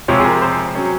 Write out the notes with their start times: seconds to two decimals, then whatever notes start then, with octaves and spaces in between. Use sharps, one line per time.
0.08 F2 C3 F3 G#3 C4 C#5
0.20 G#4
0.25 A#4
0.41 C5
0.75 F#3 C#4